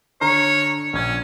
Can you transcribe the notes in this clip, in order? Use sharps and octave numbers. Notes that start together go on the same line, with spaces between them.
D3 C#5 A#5 F6
A#1 C#4 G#6